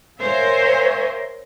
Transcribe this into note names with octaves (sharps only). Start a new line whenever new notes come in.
A#4 C5 C#5 E5 F5 G#5